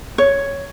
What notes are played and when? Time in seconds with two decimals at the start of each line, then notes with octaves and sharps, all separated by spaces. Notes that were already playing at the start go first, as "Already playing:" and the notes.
0.18 C#5